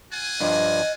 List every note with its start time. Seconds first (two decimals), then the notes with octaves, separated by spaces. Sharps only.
0.11 F4 F#5 G#5
0.40 G2 F3 D4 D#5